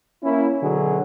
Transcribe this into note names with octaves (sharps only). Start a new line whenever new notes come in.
A#3 C#4 E4
B2 D3 F#3 G#4